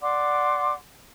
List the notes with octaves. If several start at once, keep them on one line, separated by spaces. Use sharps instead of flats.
D5 F#5 C6 D6